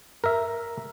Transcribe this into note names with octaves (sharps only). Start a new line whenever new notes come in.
A#4 E5